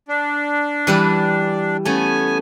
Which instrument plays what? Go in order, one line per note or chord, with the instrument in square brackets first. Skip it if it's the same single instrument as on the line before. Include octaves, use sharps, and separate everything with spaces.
[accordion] D4
[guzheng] E3 G3 B4
[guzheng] A3 C#4 [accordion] B3 G#5